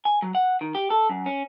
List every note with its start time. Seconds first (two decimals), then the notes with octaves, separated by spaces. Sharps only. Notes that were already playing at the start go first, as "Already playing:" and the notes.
0.05 G#5
0.22 F#3
0.35 F#5
0.61 D#3
0.75 G4
0.90 A4
1.10 F#2
1.26 C#4